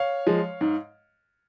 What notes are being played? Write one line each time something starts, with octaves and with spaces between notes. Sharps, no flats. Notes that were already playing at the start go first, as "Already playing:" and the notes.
Already playing: C#5 F5
F3 G#3
G#2